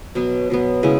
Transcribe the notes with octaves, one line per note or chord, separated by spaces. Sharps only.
B2 F#3 B3
B2 F#3 B3
C#3 G#3 C#4 E4